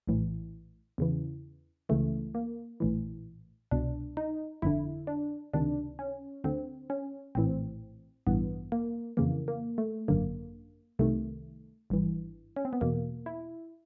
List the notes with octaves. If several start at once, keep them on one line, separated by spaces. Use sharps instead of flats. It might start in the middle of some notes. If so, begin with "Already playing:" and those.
A#1 A2 E3
E2 C#3 E3
C#2 C#3 E3 A3
A#3
A#1 A2 E3
C2 B2 D4
D#4
G1 F2 D3 E4
D4
C#2 C3 D#3 D4
C#4
D2 D3 C4
C#4
A#1 A2 E3 C4
A1 G2 E3 B3
A#3
F2 C#3 E3 A#3
A#3
A3
G#1 F#2 D3 A#3
C2 C3 D#3 A3
G#1 G2 E3
C#4
C4
B3
E2 B2 A#3
E4